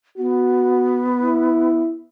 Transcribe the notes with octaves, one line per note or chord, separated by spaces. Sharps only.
B3 F#4
E4